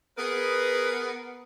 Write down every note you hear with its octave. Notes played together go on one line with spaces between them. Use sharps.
B3 G#4 A#4 B4